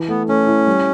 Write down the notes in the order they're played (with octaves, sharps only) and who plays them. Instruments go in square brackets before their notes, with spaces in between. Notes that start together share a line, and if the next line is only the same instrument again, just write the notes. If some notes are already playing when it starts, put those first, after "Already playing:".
Already playing: [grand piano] E3
[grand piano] A3 [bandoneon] B3
[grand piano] A3 [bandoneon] C#4
[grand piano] E4
G3